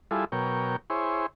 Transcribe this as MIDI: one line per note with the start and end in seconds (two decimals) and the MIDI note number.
0.11 0.25 55
0.11 0.25 64
0.11 0.25 65
0.11 0.25 68
0.11 0.25 69
0.32 0.76 47
0.32 0.76 54
0.32 0.76 70
0.32 0.76 73
0.32 0.76 79
0.90 1.26 64
0.90 1.26 68
0.90 1.26 72
0.90 1.26 73